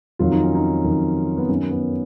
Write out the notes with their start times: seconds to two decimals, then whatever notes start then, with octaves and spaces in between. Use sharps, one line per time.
0.19 F2 D#3 F#3 F4
0.32 D#4
0.43 C#4
0.55 D#4
0.84 F2 D#3 F#3
1.38 B3
1.49 F#2 D#3 F#3 C#4
1.70 B3